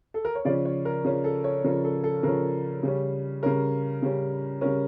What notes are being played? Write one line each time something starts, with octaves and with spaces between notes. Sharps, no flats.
A4
A#4
C#5
C#3 F3 C#4 D5
C#5
A#4
C#3 F3 C#4
A4
C#5
C#3 F3 C#4 A#4
A4
A4
C#3 F3 C#4 A#4
C#3 G3 C#4
C#3 G3 C#4 A#4
C#3 G3 C#4
C#3 G3 C#4 A#4